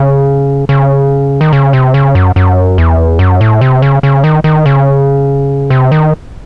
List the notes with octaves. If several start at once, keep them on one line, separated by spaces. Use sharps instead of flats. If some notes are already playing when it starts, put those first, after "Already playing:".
Already playing: C#3
C#3
D#3
C#3
C3
C#3
F#2
F#2
E2
F#2
A2
C3
C#3
C#3
D#3
D#3
C#3
C3
D#3